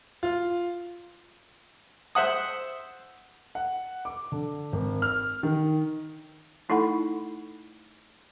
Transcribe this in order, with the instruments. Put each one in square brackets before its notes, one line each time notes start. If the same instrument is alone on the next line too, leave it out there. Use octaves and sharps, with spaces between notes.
[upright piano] F4
[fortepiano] C5 E5 F#5 D#6
[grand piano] F#5
D6
D3
G#1
F6
D#3
[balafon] A3 D#4 E4 A4 F#5 B5